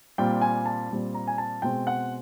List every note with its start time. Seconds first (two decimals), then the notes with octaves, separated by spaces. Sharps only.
0.18 A#2 G3 C4 G5
0.41 G#5
0.66 A5
0.90 A#2 G3 C4
1.14 A#5
1.27 G#5
1.38 A5
1.62 B2 G#3 C4 G5
1.87 F#5